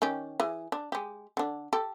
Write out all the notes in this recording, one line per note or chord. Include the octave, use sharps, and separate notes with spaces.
D#3 C#4 G4
E3 G#4
D4
G#3 G4
D3 D4
G4 A4